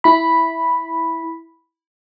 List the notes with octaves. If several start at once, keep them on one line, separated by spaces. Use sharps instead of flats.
E4 B5